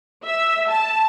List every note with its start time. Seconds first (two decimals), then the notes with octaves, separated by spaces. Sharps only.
0.24 E5
0.68 A5